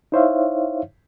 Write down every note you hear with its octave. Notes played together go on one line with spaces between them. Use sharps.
D#4 E4 C5 C#5 E5 F5